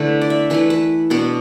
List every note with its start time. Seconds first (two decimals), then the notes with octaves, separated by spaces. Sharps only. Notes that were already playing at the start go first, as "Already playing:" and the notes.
Already playing: D3 A3 E4 B4
0.21 D5
0.30 E5
0.50 E3 A3 E4 B4
0.70 B4
1.10 B2 B3 D4 B4